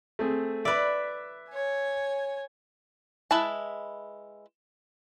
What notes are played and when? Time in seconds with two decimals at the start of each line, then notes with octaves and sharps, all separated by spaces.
0.19 A3 C4 G#4
0.65 B4 D5 E5
1.50 C#5 G#5
3.31 G#3 E4 B4 A5